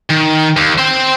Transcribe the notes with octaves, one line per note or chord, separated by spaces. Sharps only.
D#3
D#2
C5 G5